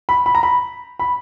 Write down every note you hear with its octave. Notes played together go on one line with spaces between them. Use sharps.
B5
B5
A#5
B5
B5